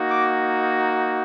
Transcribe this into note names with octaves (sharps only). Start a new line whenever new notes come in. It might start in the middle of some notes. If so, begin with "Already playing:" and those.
Already playing: A#3 D#4 F#4
D6